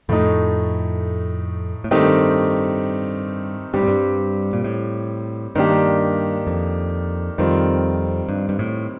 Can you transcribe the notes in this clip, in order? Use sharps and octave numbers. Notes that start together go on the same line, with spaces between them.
F2 A2 A3 D#4
A2
G2 D#3 A3 C4 D#4 G4
G2 G3 C4 G4
A2
G2
A#2
A2
G2 D#3 A#3 D4 G4
F2
F2 D#3 G3 C4 F4
G2
G2
A2